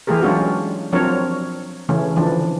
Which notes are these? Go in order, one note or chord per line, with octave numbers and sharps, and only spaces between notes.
E3 A3 G4 G#4 A#4
F#3 G#3 C#4 D4 F4 F#4
F3 F#3 C4 D4 A#4 C#5
C#3 E3 A3 C#4
D3 E3 F3 D4